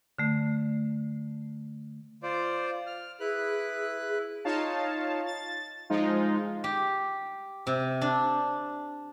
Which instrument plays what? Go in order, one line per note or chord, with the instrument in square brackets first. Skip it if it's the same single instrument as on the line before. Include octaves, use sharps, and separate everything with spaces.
[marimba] D3 A3
[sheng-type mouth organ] F4 C5 D5
F6
[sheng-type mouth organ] E4 B4 F#6 [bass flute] G#4
[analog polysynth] D#4 F4 C#5 F5 A5
A6
F3 G#3 D#4 F4
[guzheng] G4
C3
D4